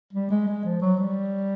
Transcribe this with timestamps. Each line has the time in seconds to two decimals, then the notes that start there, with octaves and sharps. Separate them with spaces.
0.13 G3
0.30 G#3
0.48 G#3
0.64 F3
0.82 F#3
0.99 G3